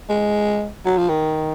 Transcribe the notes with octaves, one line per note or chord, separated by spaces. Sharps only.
G#3
F#3
F3
D#3